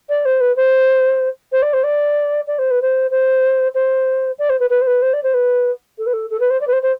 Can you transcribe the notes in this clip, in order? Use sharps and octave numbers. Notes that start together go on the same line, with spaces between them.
D5
C5
B4
C5
C5
D5
C5
D5
D5
C5
B4
C5
C5
C5
D5
C5
B4
B4
C5
B4
C5
D5
C5
B4
A4
B4
A4
A4
B4
C5
D5
B4
C5
C5